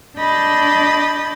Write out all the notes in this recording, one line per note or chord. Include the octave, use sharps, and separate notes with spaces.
D4 D#5 B5 G6 A6